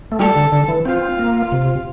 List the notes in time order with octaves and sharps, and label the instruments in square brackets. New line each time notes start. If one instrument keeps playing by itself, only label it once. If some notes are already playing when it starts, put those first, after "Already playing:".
[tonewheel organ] A3
[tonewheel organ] G3 [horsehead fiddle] A4
[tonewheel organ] D3
D3
E3
[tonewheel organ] C4 [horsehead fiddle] F4
[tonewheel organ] A#3
C3